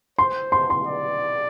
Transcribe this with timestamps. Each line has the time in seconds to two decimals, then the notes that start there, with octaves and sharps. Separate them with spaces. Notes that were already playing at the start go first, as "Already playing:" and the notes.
0.19 C5 C6
0.52 C6
0.70 C6
0.87 D5